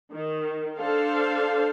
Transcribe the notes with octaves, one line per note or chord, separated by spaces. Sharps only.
D#3
D4 A4 C5 F5